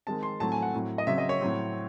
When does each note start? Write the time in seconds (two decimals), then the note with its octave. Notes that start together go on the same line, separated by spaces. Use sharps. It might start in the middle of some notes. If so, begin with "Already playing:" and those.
0.07 D#3 G#3 C4 A5
0.23 C6
0.40 A2 F#3 A3 C4 A5
0.52 G#5
0.62 F#5
0.74 A2 F#3 C4
0.98 D#5
1.07 C#3 F#3 C4 E5
1.18 D#5
1.29 C#5
1.41 A2 F#3 C4